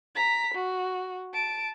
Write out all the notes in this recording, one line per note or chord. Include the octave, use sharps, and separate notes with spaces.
A#5 B6
F#4
A5 D7